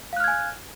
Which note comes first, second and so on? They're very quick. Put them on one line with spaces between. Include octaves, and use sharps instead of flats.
F5 F#6 F6 G#6 G#5